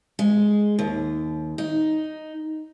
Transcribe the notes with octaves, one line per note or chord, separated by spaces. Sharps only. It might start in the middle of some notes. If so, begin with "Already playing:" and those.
G#3
D#2
D#4